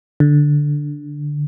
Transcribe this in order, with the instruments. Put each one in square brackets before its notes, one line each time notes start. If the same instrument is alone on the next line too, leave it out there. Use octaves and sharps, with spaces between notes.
[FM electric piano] D3